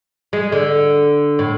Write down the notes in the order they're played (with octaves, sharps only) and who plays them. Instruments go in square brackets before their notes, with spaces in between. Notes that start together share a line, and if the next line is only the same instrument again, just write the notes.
[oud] G#3
D3
A2